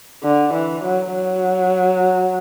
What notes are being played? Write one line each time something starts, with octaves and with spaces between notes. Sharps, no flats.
D3
E3
F#3
F#3